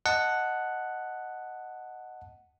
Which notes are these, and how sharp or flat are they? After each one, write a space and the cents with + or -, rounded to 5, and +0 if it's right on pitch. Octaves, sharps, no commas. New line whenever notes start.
D#5 +0 F#5 +0 A5 +0